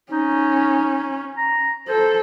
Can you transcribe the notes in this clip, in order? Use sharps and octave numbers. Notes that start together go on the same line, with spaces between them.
C#4 D#4
A#5
A4 C5